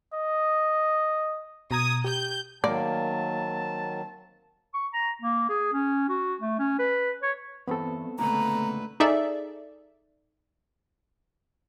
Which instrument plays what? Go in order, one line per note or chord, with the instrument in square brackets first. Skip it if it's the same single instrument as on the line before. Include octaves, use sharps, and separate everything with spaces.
[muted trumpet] D#5
[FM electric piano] B2 A#5 G#6 [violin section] D#6
[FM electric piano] G4 [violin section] G6
[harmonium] D#3 F#3 [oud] A#3 [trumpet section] C4 A5 [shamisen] D5
[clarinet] C#6
A#5
A#3
G#4
C#4
F#4
A3
C#4
B4
C#5
[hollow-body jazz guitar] E2 G2 [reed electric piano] B3 C4 A4
[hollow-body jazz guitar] C#2 A#2 D3 [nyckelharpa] A3 B4 [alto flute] A#5
[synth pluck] D#4 G#4 A4 D5 E5